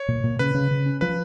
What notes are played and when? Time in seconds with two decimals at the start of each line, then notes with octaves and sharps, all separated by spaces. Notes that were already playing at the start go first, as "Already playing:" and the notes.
Already playing: C#5
0.08 A#2
0.24 A#2
0.39 C#3 B4
0.54 C#3
0.71 C#3
0.86 C#4
1.01 F3 B4